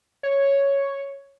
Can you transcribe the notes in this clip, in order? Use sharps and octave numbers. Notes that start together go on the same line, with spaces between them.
C#5